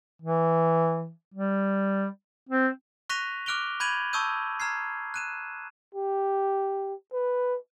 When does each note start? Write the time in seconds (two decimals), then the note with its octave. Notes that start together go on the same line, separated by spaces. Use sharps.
0.22 E3
1.34 G3
2.49 C4
3.09 C#6 F#6 A#6 B6 D#7 F7
3.46 D6 F6 F#6 D7 F7 G7
3.80 B5 G6 G#6 D#7 F7 F#7
4.13 A5 C#6 D#6 E6 G6 D#7
4.60 A#5 F6 G#6 C7
5.14 F#6 D#7 E7
5.95 G4
7.13 B4